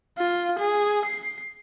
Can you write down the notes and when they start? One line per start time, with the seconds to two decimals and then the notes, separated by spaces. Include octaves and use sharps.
0.18 F4
0.59 G#4
1.05 C7